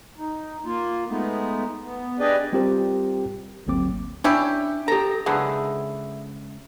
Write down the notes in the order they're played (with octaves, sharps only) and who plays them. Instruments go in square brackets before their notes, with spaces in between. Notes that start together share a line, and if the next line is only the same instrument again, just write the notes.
[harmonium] D#4
A#3 F4
G#3 A3 B3 D#4
B3
D4 G4 G#4 B4 D5 D#5
[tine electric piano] G3 C4 F4 G4 A#4 C5
G1 D2 F#3 A#3 C4 D6
[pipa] C#4 E4 G4 [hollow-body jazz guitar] D4
[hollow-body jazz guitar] G4 A4 [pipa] A#5
[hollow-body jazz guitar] C#2 G#4 F#5 [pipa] D3 E3